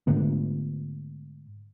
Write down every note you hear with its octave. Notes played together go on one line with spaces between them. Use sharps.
G#2 D3 A3 B3